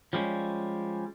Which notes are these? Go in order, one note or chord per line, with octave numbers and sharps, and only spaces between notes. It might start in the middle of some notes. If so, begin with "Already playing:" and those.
F3 G3 G#3 C#4